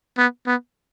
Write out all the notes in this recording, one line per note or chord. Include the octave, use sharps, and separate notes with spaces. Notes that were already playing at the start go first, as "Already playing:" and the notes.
B3
B3